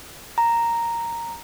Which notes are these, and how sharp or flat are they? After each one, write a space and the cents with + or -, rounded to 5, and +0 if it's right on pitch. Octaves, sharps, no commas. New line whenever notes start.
A#5 -5